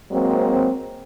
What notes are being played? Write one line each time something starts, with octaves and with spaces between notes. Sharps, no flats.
F#3 G#3 A#3 C4